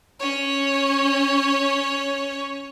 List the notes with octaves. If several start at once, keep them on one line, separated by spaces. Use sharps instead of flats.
C#4 C#5